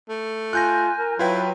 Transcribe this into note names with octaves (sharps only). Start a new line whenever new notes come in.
A3
F4 G#5 F#6 G6 A#6
A#4
F#3 E4 F4 B4 G5